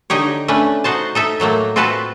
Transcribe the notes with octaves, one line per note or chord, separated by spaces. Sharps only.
D3 D#4 G4 C#5
A3 C#4 D4 B4
D#4 F#4 C5 A5
D#4 A4 E5
A2 F#3 A3 A#3
C4 F4 F#4 A4 B4 A5